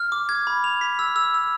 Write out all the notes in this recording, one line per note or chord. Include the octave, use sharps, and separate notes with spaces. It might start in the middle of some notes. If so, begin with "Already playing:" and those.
Already playing: F6
D6
G#6
B5
F7
B6
E6
E6
E6